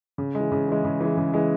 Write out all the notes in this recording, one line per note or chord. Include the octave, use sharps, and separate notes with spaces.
C#3
E3 G#3
C#3
E3 G#3
C#3
E3 G#3
C#3
E3 G#3